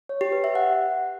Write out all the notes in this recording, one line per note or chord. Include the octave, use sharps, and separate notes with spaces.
C#5
G4
B4
E5
F#5